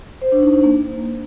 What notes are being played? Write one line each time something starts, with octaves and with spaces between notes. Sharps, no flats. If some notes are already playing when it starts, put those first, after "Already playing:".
C5
D4
D#4
D4
A#3